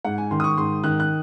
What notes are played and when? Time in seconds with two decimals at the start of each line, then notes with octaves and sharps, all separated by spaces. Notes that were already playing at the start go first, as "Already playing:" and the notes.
0.05 G#2 F#5
0.18 G#5
0.31 D#3 C6
0.40 D#6
0.44 C#6
0.58 G#2 C6
0.84 D#3 F#6
1.00 F#6